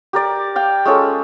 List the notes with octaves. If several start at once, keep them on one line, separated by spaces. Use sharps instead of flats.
G4 A#4 D5
F5 G5
G#3 C#4 F4 A4